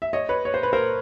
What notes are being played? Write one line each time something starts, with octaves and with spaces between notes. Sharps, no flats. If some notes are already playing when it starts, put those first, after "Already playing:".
E5
C#5 D#5
B4 C#5
C#5
C5
B4
A#4 C5